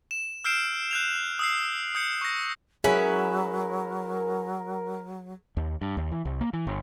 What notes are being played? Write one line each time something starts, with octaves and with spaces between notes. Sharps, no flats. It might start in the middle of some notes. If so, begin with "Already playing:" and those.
E7
E6 F6 G6 C7 D7 E7
F#6 G6 F7
D#6 E6 C7
D#6 G6 C#7
C#6 A#6
F#3 C#4 E4 G#4 A#4 B4
D#2
G2
D#2
E3
C2
A#3
E3
G1